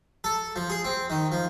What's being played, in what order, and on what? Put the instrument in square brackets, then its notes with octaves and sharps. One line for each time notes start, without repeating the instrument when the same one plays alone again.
[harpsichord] A4
F3
G#4
C4
D#3
F3